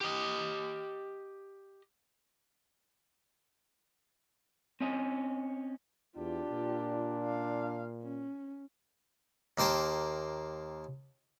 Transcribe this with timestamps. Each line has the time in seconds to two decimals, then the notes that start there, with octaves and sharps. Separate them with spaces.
0.01 G4 D#5
4.81 C4 C#4 D#5
6.17 E2 D4 F4 G4
6.51 A#2
7.23 F5
8.02 C#4
9.58 D#2 A#3 C5 G5 A5